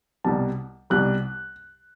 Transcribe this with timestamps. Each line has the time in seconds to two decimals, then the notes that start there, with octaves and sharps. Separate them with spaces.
0.24 C2 B2 G3 A5
0.90 C2 B2 G3 F#6